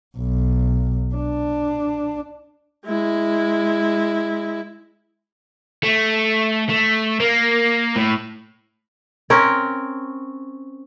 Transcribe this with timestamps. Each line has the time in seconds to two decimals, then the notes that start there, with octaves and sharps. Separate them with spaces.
0.18 B1
1.15 D4
2.86 G#3 E4
5.83 A3
6.70 A3
7.20 A#3
7.96 A2
9.30 C4 C#4 A#4